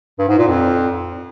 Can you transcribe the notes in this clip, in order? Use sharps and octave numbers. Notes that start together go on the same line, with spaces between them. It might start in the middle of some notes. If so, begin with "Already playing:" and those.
G2
G#2
A#2
F2